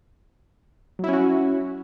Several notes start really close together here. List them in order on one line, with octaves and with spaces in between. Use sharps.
F#3 E4 C#4 F#4